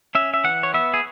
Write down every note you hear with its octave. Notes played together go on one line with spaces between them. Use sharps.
C#4 E5
E5
E3 F#5
C#5
B3 E5
G#4